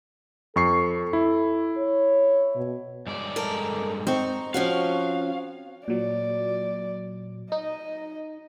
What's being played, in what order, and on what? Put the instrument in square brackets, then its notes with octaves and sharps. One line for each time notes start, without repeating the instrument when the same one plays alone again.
[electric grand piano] F2 C#6 C7 [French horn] A4
[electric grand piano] E4
[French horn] C#5
B2
[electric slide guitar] G2 G#3 D5
[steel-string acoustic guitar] A4 A#4
[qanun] C4 C#6 [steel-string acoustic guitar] D#4
[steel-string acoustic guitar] F3 C#4 F#4 [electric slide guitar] F5
[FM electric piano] A#2 F#3 [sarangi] D5
[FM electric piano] D#4 [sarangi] D#5